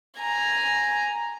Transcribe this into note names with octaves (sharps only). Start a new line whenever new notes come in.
G#5 A#5